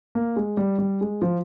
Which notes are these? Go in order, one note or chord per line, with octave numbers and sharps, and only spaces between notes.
A#3
G#3
G3
G3
G#3
F3